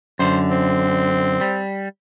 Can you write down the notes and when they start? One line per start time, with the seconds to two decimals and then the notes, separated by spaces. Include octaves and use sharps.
0.19 F#2 D3 C5
0.51 C4
1.41 G3